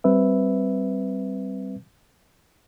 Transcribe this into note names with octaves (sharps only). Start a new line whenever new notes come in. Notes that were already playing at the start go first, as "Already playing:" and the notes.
G3 C4 B4 E5